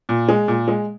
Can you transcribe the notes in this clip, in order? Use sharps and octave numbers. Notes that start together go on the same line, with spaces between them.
A#2
G#3
A#2
G#3